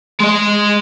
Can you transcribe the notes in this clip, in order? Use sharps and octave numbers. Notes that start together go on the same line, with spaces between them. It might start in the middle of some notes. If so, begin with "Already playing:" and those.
G#3 D#5